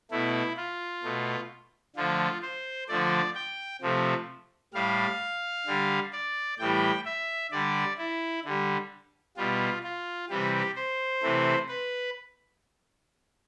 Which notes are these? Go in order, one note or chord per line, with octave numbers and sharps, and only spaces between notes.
B2 A3 E4
F4
B2 A3
D3 F3 A3 F4
C5
D3 F3 A3 D5
G5
C3 F3 A3
A2 G3 F5
D3 G3
D5
A2 E3 G3 G5
E5
D3 G3 D5
E4
D3 G3
B2 G3 F4
F4
C3 E3 G3 G4
C5
C3 E3 A3
B4